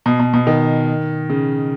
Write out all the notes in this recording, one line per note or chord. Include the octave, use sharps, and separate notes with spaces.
B2
B2
B2
D#3
C#3